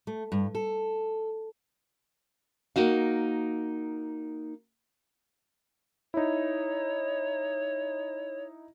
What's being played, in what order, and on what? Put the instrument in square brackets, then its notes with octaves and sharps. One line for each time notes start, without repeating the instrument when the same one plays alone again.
[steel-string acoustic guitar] A3
G2
A4
[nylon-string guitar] A#3 D#4 F#4 F5
[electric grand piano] D#4 E4 [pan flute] C#5